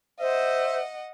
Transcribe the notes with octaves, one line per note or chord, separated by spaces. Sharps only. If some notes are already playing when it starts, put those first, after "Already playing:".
C5 D#5 E5 F#5